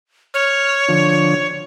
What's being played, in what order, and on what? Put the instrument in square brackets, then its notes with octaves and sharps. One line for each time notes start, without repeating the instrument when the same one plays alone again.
[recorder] C#5 [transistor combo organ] F6
[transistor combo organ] D3 F3